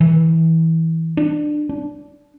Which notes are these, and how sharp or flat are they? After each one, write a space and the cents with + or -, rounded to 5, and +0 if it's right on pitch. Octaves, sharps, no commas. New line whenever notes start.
E3 -20
D4 +25
D4 -20